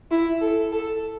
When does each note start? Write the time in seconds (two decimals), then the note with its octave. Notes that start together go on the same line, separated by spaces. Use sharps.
0.11 E4
0.41 A4
0.72 A4